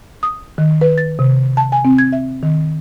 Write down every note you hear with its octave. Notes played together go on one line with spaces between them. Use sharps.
D#6
D#3
B4
A6
C3
A5
G#5
C4
G#6
E5
D#3